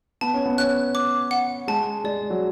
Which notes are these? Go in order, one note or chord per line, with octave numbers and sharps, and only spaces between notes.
B3 A5
C#4
B3
C#4 F#6
D6
F#5
G#3 A5
G#3 D5
F#3